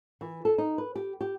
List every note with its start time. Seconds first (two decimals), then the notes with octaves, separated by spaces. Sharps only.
0.21 E3
0.45 A4
0.58 D#4
0.78 B4
0.96 G4
1.21 G4